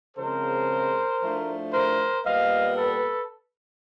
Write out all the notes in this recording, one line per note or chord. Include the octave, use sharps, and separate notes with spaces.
C#3 F3 G#3 C4 A#4 C5
A2 F3 A3 D4
A#4 C5
A#2 G3 B3 D#5 F5
A4 B4